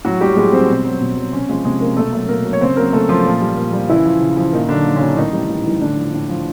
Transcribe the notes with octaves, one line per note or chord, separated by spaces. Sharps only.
A2 F#3 F#4
F#3 G3 G4
A2 G#3 G#4
F#3 C4 C5
B2
F#3
B2
F#3
C3 C#4 C#5
F3 G#3 G#4
C3 G#3 G#4
F3 A#3 A#4
B2 A3 A4
F#3 A3 A4
B2 A#3 A#4
F#3
C#5
C#3 C4 C5
F#3 A#3 A#4
C#3 A3 A4
F3 F#3 F4
A#2
G3
A#2
G3
C#3 E3 E4
F3
C#3
F3
A#2 D#3 D#4
D3 F#3 D4
A#2
C#3 C#4
F#3
A2 D#3 D#4
E3 G3
A2
E3 G3
A2 D3 D4
F3
A2
F3